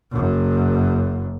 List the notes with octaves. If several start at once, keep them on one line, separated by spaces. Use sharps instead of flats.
F#1 F#2